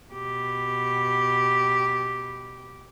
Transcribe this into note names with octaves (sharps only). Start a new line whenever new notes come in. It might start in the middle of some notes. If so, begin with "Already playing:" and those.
B2 G4